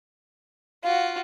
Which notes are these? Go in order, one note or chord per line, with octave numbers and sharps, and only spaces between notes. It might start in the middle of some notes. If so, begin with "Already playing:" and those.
F4 F#4 F5